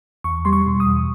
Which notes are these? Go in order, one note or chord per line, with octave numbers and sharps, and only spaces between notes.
E2 C#6
G3 C6
C#6
B2
D#6
E2